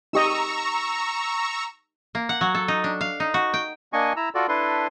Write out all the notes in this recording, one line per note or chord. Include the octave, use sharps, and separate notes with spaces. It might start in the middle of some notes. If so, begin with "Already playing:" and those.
D#4 G4 D#5 A#5 C#6 E6
A#3
F#5
F#3
A4
D#4
D4
F5
D#4
F#4
G5
A#3 D4 D#5 G#5 C#6
E4 A#5 E6
F4 F#4 A4 D5
D4 E4 A4 B4 C6